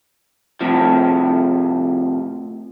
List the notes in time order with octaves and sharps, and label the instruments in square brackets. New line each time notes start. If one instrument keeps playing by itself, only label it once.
[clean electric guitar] A2 C3 F3